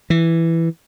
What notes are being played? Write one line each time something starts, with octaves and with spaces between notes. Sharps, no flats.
E3